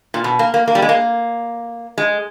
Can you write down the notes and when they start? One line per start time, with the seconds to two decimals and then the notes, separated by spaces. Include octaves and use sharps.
0.14 A#2
0.24 B2
0.39 A#3
0.54 A#3
0.68 A#3
0.75 G3
0.82 G#3
0.89 A#3
1.98 G#3